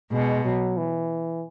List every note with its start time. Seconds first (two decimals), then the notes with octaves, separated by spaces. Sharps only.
0.12 B2 G#3
0.45 F#3
0.77 E3